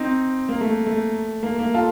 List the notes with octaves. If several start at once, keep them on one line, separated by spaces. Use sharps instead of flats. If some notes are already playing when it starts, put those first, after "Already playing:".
Already playing: C4 D#4
A#3
A3
A3
A#3
A#3
F4 A4